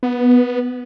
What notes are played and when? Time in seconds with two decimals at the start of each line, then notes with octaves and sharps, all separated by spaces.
0.03 B3